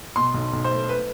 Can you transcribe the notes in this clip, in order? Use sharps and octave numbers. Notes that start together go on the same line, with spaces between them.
B2 C6
B1
B1
C5
A3
B4